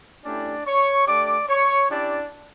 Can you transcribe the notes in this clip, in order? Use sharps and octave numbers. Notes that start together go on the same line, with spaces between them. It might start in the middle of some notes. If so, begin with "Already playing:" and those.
A3 C#4 D4 E4 G4 D5
C#5 C#6
A3 D4 G4 D5 D6
C#5 C#6
C#4 D4 E4 G4 D5